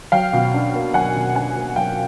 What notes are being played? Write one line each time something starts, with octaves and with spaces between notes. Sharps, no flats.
F#3 F5 G5
B2
D4
A#3
F#3 F#5 G#5
B2
D4 F#5 G#5
A#3
F#3 F5 G5